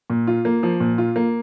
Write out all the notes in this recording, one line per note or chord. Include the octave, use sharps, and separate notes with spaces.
A#2
F4
A#3
F3
A#2
F4
A#3